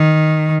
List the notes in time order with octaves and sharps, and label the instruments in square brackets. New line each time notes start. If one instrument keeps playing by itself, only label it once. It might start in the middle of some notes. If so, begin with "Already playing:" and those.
Already playing: [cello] D#3